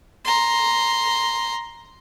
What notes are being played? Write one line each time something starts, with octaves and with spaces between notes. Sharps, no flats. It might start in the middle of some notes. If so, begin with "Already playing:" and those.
A#5 C6